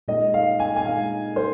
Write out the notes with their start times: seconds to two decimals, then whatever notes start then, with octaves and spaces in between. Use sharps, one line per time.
0.08 A#2 G#3 D#4 D#5
0.34 F5
0.59 G#5
0.76 G#5
0.84 A#2 G#3 D#4 F5
1.36 C5